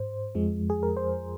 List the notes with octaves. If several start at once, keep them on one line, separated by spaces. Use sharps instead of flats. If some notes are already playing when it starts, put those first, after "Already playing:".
Already playing: G#2 C5
F2 F3 G#3
G#4
A#4
C5